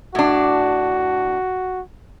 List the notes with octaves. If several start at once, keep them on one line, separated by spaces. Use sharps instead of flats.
A2 D4 F#4